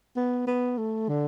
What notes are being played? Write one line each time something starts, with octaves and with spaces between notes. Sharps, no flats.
B3
B3
A3
D3